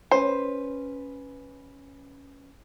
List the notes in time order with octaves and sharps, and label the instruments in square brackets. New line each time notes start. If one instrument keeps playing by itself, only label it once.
[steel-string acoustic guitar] C#4 B4 [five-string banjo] C5